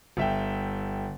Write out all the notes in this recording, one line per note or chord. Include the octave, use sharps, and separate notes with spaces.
G1 E5 G5